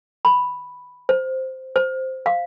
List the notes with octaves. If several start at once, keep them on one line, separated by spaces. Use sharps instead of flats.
B5
C5
C5
F5